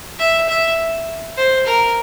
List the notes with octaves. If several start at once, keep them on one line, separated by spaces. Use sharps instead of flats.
E5
E5
C5
A#4